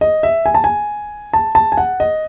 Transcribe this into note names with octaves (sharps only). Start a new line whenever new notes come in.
D#5
E5
G#5
A5
G#5
A5
A5
G#5
F#5
D#5